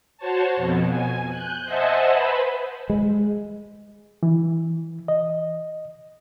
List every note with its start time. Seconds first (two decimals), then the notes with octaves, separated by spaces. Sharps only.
0.18 F#4 C5 C#5 A5
0.57 F2 B2
0.88 G#5
1.29 F#6 G6
1.65 C5 D#5 E5 F#5 G#5 A5
2.10 B4 C5 B5
2.90 G#3
4.23 E3
5.08 D#5